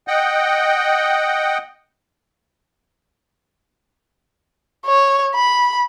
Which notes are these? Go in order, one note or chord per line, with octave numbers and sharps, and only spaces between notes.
D#5 F#5 G5
C#5
B5